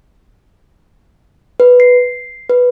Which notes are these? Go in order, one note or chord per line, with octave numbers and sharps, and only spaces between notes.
B4
C7
B4